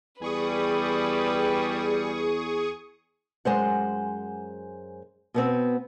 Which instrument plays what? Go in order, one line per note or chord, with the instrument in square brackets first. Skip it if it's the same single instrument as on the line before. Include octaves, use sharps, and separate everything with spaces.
[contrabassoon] E2 [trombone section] G3 [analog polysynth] G#4 C#6 D#6 [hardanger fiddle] B4
[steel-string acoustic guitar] F#2 G#3 C5 F#5
B2 B3 C4